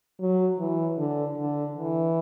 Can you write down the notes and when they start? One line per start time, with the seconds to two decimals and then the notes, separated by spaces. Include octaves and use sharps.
0.20 F#3
0.59 E3
0.98 D3
1.38 D3
1.77 E3